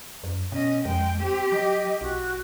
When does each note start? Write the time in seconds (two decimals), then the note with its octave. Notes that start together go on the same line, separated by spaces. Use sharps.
0.23 F#2
0.52 B2 C#4 D#5
0.85 F2 G#3 G5
1.19 C4 G4
1.52 F#3 D#5
2.01 B1 F#4